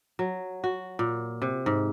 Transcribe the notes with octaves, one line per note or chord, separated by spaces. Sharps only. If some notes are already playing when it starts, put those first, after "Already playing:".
F#3
F#4
A#2
C3
G#2